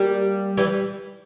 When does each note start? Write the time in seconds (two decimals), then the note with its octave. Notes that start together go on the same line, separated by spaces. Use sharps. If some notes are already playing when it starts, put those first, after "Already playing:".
Already playing: G3 A#3
0.57 E3 G3